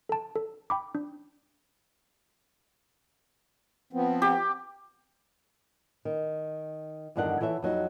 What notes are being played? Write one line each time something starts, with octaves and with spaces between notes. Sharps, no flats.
A4 A5
A4
G5 B5 D6
D4
F3 B3 C4
G4
D#3
E2 G2 D3 D#3 D4 F#5
E3 A4 C#5 E5
F2 F#3 D#4